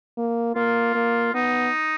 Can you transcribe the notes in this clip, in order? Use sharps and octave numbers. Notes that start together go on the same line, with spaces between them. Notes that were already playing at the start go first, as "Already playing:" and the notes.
A#3
A#3 F4
A#3
B3 D#4